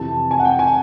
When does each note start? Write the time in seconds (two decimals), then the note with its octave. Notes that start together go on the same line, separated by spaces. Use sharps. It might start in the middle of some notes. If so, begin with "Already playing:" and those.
Already playing: F2 C3 E3 A5
0.31 G#5
0.39 F#5
0.45 G5
0.59 G#5